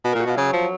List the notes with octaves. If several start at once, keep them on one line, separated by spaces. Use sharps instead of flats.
B2
A#4
A#2
F#4
B2 F4
C#3 F#3
F3